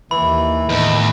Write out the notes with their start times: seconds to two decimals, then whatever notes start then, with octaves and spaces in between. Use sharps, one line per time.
0.11 D#2 E3 B5
0.69 E2 A2 D#3 D#4